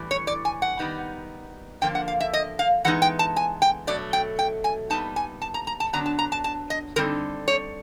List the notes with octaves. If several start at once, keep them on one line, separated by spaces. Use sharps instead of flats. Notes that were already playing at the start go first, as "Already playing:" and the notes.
Already playing: A2 E3 G3
C#5
D5
G#5
F#5
D#3 G3 B3 D#4
D3 F3 A#3 G5
F#5
F5
E5
D#5
F5
E3 G#3 B3 D#4 F#5
G5
A5
G#5
G5
B2 F#3 A3 D5
G5
G5
G#5
A#2 G3 B3 D#4 A5
G#5
A5
A#5
A#5
A5
D3 F#3 B3 D4 A#5
A5
A#5
A5
A5
D#5
D3 G3 C4 D#4 A#4
C#5